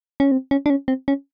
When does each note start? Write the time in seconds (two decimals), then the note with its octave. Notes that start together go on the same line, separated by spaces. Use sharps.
0.20 C#4
0.31 C4
0.51 C#4
0.66 D4
0.70 C#4
0.88 C4
1.08 C#4